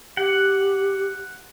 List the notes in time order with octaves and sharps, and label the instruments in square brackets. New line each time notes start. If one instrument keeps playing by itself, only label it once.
[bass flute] G4 [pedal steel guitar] F#5